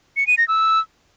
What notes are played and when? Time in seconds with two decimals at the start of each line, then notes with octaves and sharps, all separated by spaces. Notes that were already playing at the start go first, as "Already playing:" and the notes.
0.17 C#7
0.27 D#7
0.38 A#6
0.48 E6